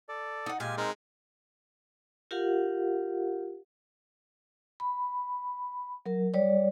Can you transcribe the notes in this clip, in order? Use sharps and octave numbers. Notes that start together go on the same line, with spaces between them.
A4 D5
D#4 F#5
A#2 G#3 F4 G4 F5 G#5
G#3 C4 D#4 A#4
F4 G4 A#4 F5 F#5
B5
F#3 A#4
G3 C#5 D5